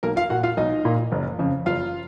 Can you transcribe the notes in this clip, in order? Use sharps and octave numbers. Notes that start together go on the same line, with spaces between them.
B1 A#3 A#4
F4 F5
A#2 F#4 F#5
F4 F5
B1 D#4 D#5
A#2
F#1
F2 C#3
F#1 F4 F5